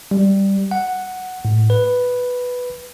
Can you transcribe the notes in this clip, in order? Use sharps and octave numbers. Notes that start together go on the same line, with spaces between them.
G3
F#5
A2
B4